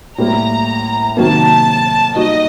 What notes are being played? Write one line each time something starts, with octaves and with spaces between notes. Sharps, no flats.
A2 G3 A#3 A#5
C3 D#3 F#3 A#3 A5
G3 A#3 D#4 F#4 D#5